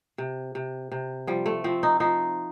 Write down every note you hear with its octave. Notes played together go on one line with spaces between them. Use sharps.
C3
C3
C3
F3 G3
A3
F3 C4
D#4
F3 D#4